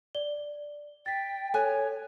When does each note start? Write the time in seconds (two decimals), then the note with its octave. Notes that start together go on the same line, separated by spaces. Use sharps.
0.15 D5 G7
1.06 G5 A6 B6
1.54 A4 C#5 G#5 F#6